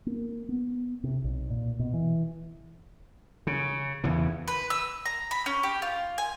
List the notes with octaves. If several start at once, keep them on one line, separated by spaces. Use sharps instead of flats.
A#3
B3
C3
B1
A#2
B2
E3
C#3
E2 C#3 E3
B4
E6
A#5
B5
C#4
G4
F4
G#5